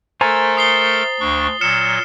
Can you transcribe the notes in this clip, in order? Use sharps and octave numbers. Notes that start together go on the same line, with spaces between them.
A3 A4 A#4 C5 G#5 A#5 A6
D#6 C7 G7
D2 D4 C#6
A#2 F#3 F6 C#7 E7